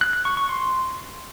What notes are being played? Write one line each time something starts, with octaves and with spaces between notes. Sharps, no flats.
F#6
F#6
C#6
C#6
C6